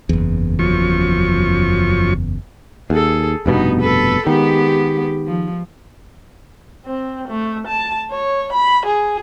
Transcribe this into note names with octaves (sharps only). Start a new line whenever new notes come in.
F#1 E2
F#2 F3 C#6
D#2 G#4 A4
F1 G2 B2 B3 D#4
A4 B4
D#3 G#3 B3 G4
F3
C4
A3
A5
C#5
B5
G#4